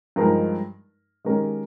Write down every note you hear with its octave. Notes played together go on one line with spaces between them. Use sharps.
G2 F3 G#3 D#4 A#4
D#3 G#3 C#4 G4 A#4